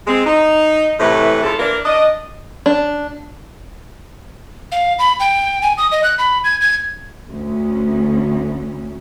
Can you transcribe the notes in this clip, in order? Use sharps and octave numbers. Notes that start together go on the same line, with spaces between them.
G#3 C4
D#4
A2 C3 E3 A3 B4
C#3 E4 F4 A4
E3 A#3 D4 A#4
D4 D#5
D4
F5
B5
G5
G#5
D#6
D#5
F#6
B5
G#6
G#6
D2 C#4